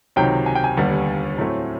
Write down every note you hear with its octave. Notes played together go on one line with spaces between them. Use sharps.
C#2 C3 D#3 F#3 G5
G#5
G5
G#5
D#2 D3 G3 B3
A2 F#3 A3 C4